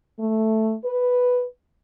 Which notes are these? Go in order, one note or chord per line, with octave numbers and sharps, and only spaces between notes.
A3
B4